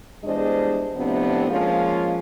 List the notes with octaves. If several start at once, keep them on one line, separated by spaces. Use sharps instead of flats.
E2 G2 G#3 D4 C5 D#5
A2 C3 F3 B3 C4 D4
F3 G#3 A#3 C#4 F4